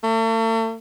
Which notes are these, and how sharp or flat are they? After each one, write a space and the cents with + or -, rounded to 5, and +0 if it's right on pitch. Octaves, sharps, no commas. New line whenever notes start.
A3 +40